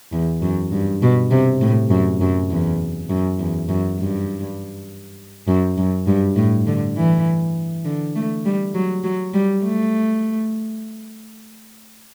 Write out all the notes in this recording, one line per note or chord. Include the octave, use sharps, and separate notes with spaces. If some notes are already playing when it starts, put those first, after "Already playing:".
E2
F#2
G2
B2
C3
A2
F#2
F#2
E2
F#2
E2
F#2
G2
F#2
F#2
G2
A2
D3
E3
D3
A3
G3
F#3
F#3
G3
A3